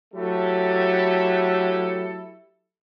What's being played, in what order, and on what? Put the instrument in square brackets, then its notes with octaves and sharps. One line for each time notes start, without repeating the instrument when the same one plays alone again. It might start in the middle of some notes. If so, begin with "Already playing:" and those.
[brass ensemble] F#3 A3 E4 G4 A4